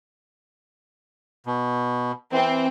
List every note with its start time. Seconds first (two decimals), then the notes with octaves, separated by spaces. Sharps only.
1.46 B2
2.32 E3 C4